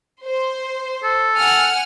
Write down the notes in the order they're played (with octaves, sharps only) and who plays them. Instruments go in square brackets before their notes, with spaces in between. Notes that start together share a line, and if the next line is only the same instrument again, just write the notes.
[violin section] C5
[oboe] A4
[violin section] F#5 G#5 F6